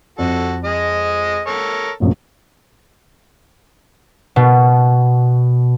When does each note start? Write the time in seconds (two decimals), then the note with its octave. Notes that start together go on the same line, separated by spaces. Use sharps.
0.19 F2 F#4 A4
0.64 G#3 D#5
1.47 A4 A#4 C#5
2.00 F1 A#1 F#2
4.36 B2